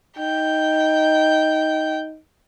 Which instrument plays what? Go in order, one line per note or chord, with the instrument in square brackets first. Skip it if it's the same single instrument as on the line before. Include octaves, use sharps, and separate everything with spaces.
[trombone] D#4 [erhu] G5